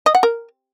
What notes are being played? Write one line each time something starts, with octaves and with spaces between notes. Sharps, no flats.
D#5
F#5
A#4